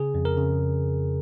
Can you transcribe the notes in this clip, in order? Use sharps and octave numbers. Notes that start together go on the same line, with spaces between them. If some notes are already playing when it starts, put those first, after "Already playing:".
Already playing: C#3 G#4
F2
A#4
C#3